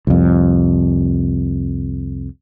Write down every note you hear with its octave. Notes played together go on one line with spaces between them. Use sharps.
C2 F2